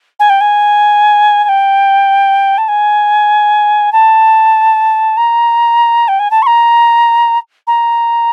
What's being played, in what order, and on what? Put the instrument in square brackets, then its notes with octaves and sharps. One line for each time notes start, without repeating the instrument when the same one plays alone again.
[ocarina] G#5
G5
G#5
G#5
G5
A5
G#5
A5
A#5
G5
G#5
A5
C#6
A#5
A#5